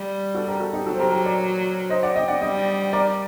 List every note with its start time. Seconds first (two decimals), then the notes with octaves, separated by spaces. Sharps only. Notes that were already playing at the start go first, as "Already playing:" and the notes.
Already playing: G3
0.35 F#4 A4
0.48 G4 A#4
0.60 F#4 A4
0.73 D#4 G4
0.86 F#3 F#4 A4
0.95 C5
0.99 G4 A#4
1.12 G4 A#4
1.25 A#4 D5
1.90 C5 D#5
2.03 D5 F#5
2.16 D#5 G5
2.28 D5 F#5
2.41 G3 D#5 G5
2.93 A#4 D5